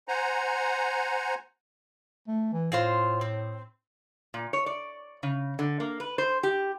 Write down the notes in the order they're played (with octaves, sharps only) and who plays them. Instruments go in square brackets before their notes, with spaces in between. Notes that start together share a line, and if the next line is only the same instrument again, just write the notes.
[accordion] C5 F#5 G#5 A#5
[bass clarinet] A3
E3
[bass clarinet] A2 [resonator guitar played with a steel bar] C4 F4 C5
[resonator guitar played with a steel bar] C4
A#2
C#5
D5
C#3
D3
A#3
B4
C5
G4